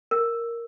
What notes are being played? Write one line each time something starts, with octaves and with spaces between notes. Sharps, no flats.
A#4